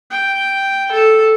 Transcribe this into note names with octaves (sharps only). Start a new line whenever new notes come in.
G5
A4